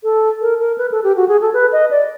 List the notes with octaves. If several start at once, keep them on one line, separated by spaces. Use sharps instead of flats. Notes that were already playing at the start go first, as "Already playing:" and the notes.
A4
A#4
A#4
B4
A4
G4
F#4
G#4
A4
B4
D#5
D5